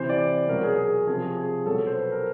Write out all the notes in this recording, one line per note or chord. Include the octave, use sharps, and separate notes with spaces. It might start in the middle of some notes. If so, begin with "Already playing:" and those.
Already playing: C3 E3 C5
D5
B2 F#3 A#4
G#4
G#4
C3 F3 G#4
G#4
B2 F#3 A4
C5
B4
A#4